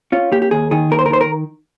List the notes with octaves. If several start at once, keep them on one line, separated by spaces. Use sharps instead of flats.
C#4 F4
A#3 G4
G4
D#2 G#4
D#3 G#4
D#2 A#4
C5
A#4
D#3 C5
A#4